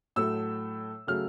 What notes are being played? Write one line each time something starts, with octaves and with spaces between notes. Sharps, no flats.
A2 F#3 A3 E6
C#3 F#3 A3 F6